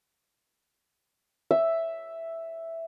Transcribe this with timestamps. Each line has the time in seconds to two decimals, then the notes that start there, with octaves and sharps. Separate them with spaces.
1.51 E5